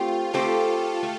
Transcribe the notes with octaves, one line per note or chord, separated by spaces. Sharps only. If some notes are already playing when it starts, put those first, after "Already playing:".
Already playing: A3 C4 F4 G4 C5
A3 C4 G4 A4 C5
A3